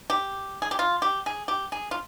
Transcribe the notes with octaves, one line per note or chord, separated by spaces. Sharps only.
G4
G#4
G4
F4
G4
G#4
G4
G#4
F4